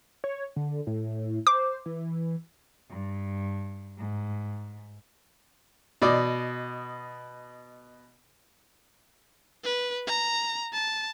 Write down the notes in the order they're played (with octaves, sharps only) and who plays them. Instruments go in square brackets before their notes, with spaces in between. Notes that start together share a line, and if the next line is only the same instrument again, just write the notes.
[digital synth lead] C#5
D3
A2
[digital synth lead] C5 [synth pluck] D6
[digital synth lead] E3
[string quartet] G2
G#2
[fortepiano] B2 D5 D#5
[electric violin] B4
A#5
A5